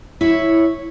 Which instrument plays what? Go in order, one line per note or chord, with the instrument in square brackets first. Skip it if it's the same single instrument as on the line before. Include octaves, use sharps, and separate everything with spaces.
[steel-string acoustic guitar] E4 C#5